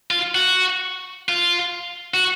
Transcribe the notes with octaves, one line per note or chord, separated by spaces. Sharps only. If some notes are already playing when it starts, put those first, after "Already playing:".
F4
F#4
F4
F#4